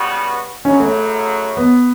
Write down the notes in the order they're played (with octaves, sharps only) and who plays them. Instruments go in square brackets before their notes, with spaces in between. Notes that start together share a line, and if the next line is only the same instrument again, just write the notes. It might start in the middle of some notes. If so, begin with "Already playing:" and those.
Already playing: [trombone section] C#3 G3 B3 F#4 B4
[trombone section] F#2 C#3 F#3 [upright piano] C#4
[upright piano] A3
B3